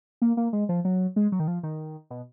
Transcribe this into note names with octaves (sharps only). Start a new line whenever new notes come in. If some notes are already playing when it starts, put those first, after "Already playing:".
A#3
A#3
G#3
F3
F#3
G#3
F#3
D#3
F3
D#3
B2